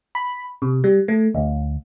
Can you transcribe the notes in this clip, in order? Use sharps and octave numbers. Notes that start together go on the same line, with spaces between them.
B5
C3
G3
A3
D2